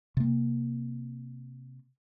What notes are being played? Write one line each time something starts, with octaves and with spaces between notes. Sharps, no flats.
C3 A#3